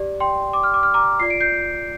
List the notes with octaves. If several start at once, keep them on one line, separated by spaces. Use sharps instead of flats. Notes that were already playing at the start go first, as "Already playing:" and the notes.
Already playing: G4 D5
G5 C6
D6
F6
D6
F6
A#5 D6
F4 D5 C7
D7
G6 C7